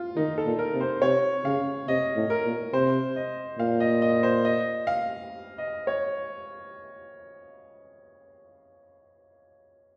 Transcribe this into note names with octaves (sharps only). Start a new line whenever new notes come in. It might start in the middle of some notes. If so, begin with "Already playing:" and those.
Already playing: F4
D#3 D#4
A4
A#2
A#4
C3
C5
C3 C#5
C#3 F5
C3 D#5
A2
A#4
A#2
C3 C5
D#5
A#2 F5
D#5
D#5
C5
D#5
F5
D#5
C#5